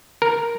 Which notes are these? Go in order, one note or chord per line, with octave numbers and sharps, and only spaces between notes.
A#4